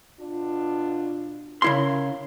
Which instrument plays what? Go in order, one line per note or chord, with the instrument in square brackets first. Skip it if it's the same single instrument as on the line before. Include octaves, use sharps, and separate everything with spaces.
[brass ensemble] B2 D4 F4
[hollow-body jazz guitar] C#3 E4 C6 [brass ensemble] A#4 F5